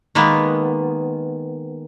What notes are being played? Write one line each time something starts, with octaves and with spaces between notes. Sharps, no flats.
D#3 G#3 A#3 B3